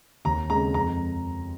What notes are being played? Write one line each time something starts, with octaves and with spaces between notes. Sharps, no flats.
D#2 A#5
C#3 G#3 A#5
F2 A#5